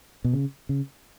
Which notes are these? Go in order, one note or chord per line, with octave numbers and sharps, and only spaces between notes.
B2
C#3
C#3